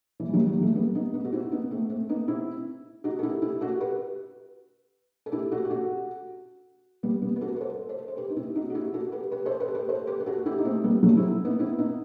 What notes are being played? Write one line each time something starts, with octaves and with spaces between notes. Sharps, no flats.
E3
G3
D#3 F#3
E3 G3
F#3 A3
G3 B3
B3 D#4
B3 D#4
F#4
C4 E4
B3 D#4
A3 C4
A3 C4
B3 D#4
C4 E4
D#4 F#4
A4
E4 G4
E4 G4
F#4 A4
G4 B4
A4
E4 G4
F#4 A4
G4
F#4 A4
G3 B3
G3 B3
B4
F#4 A4
B4
A4 C5
A4 C5
C5
G4 B4
D#4
C4 E4
D#4 F#4
F#4
E4 G4
F#4 A4
G4 B4
G4 B4
A4 C5
G4 B4
A4
G4 B4
A4 C5
G4 B4
G4
F#4 A4
E4 G4
D#4
A3 C4
G3 B3
F#3 A3
C4 E4
B3 D#4
C4 E4
B3 D#4